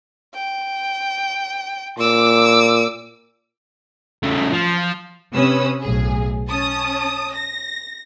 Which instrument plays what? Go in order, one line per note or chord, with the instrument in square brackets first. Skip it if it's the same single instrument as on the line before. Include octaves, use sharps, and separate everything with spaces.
[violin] G5
[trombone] A#2 [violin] D6 E6
[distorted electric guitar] C#3 A3
F3
[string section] C3 C#4 B4 D#6 E6
B1 A2 G#4
C#4 A5 D#6
A#6